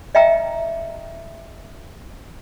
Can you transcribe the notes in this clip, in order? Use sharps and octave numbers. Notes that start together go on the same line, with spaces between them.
D#5 E5 G5 A#5 E6